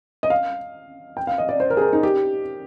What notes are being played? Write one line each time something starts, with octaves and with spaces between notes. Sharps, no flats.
D#5
F5
G5
F5
D#5
D5
C5
A#4
G#4
A#4
D#4
G4